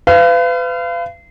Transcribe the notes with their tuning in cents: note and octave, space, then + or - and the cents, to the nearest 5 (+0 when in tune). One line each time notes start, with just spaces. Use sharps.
B4 +35 F5 -30